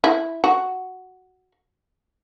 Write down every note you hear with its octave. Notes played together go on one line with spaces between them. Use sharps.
E4
F#4